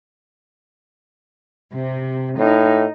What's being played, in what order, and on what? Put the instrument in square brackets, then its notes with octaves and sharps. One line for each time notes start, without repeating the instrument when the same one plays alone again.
[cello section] C3
[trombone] A2 [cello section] D#4